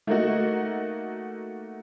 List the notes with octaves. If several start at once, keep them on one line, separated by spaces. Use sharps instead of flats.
A3 A#3 D#4 F#4